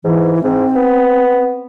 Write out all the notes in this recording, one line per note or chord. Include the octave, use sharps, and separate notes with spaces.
G#2 E3
G#2 C4
B3